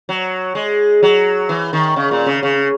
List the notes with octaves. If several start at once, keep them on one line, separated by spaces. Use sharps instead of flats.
F#3
G#3
F#3
E3
D#3
C#3
A#2
C#3
C#3